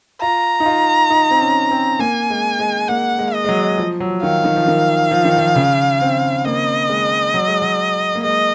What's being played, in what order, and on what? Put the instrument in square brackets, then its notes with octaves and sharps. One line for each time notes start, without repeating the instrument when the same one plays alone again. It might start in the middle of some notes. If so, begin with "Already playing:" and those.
[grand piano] F4 [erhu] A#5
[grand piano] D#4
F4
D#4
C4
C#4
C4
[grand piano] A#3 [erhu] G#5
[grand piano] G#3
G#3
[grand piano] A#3 [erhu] F#5
[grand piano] G#3
[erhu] D#5
[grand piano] G#3
F#3
F3
F#3
[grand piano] D#3 [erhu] F5
[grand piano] D#3
F3
D#3
F3
D#3
F3
C#3
C4
[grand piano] A#3 [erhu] D#5
[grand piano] G#3
F#3
G#3
F#3
A#3
[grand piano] G#3 [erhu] D#5